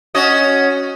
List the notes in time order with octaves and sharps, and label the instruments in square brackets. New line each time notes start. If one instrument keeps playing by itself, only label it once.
[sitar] C#4 F#4 D#5